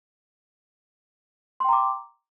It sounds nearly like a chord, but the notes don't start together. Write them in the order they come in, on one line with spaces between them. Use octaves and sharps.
C6 G5 A#5 D6